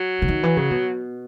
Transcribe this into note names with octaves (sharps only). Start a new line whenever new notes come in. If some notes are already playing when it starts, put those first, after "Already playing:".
Already playing: F#3
C#3
D#3
E3
C#3
B2